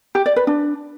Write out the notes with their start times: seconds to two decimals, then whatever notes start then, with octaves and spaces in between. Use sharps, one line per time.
0.15 G4
0.26 D5
0.36 B4
0.47 D4